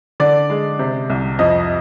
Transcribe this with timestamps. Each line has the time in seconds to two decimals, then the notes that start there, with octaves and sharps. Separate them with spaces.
0.20 D3 D5
0.50 G#3
0.79 C3
1.10 C2
1.39 F2 D#5